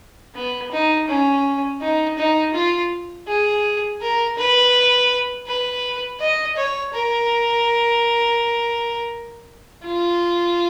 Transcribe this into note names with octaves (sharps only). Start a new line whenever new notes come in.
B3
D#4
C#4
D#4
D#4
F4
G#4
A#4
B4
B4
D#5
C#5
A#4
F4